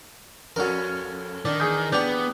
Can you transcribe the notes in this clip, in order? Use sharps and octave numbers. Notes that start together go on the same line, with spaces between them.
F2 C#4 F#4 A4 A#4
D#3 D4
E2 G#4 D#6 G6
B3 D4 G4 G6 F7